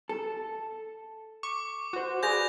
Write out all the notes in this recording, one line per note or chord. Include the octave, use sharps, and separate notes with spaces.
A4
C#6 D6
F#4 C5
G#4 B4 D5 G6 A#6 F7